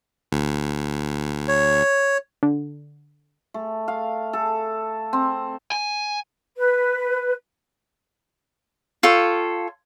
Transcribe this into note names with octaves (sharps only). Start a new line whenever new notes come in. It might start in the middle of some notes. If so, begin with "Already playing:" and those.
D2
C#5
D3
A3
F5
A4
C4
G#5
B4
F4 A4 C#5 G5